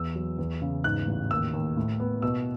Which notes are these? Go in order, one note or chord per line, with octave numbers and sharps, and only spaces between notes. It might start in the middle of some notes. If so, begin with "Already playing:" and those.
Already playing: E2 E6
F#3
E2
C#3
G#2 F#6
A1
D#2 E6
D#2
A2
B3
B2 E6